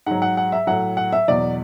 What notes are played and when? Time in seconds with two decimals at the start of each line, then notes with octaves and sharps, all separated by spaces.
0.06 G#2 F#3 F#5
0.22 F#5
0.37 F#5
0.52 E5
0.67 A2 F#3 F#5
0.97 F#5
1.12 E5
1.28 E2 B2 F#3 D5